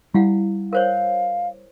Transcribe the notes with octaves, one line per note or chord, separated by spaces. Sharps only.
G3 E4 F5 F#5
A#4 C5 C#5 F5